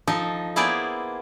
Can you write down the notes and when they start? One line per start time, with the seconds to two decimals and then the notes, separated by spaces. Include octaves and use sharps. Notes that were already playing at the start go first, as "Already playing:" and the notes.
0.07 F3 D#4 A4 D#5
0.56 A#3 B3 E4 G#4 C5 D5